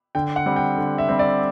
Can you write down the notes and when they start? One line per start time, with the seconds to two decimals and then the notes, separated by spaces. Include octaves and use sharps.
0.15 D3 G5
0.36 F#5
0.46 G3 C4
0.56 G5
0.78 D3
0.98 E5
1.09 G3 C4
1.19 D5